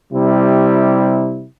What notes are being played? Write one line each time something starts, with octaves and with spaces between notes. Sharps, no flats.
C3 G3 E4